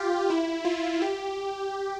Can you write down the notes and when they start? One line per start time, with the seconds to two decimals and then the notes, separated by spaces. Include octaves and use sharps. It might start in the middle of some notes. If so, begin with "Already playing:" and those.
Already playing: F4 G4
0.30 E4
0.65 F4
1.02 G4